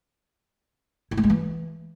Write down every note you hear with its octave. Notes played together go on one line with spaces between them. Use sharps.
E4
A3
G#3
E3